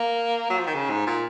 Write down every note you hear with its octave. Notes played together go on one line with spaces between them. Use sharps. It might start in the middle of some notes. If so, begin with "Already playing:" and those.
Already playing: A#3
F#3
F3
D#3
C#3
G#2
A#2